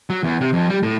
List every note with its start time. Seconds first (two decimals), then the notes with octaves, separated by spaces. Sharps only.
0.10 F#3
0.23 E2
0.41 C3
0.53 F2
0.70 G3
0.83 A2